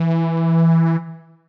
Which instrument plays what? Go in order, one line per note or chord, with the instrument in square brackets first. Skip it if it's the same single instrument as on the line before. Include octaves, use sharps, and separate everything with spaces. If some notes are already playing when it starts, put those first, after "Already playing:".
Already playing: [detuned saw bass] E3